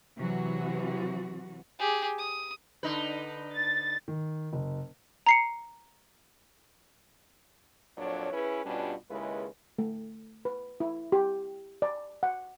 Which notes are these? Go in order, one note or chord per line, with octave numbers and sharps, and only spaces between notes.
C3 E3 F#3 F#4
G4 G#4
D#6
D3 D#4 B4
A6
D#3
F#1
A#5 C7 C#7
F2 A#2 F#3 D4 C#5
C#4 E4 G#4 B4
G2 B2 G3 C#4 D4 F4
D#2 C#3 G#3 E4 B4
A3
B4
E4
G4
D5
F#5